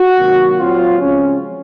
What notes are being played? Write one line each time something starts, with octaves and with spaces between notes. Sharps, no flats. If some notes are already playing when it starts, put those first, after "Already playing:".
Already playing: F#4
C3 D#3 F#3 A#3
A#2 F#3 C4 F4
C#3 F3 G#3 C4 C#4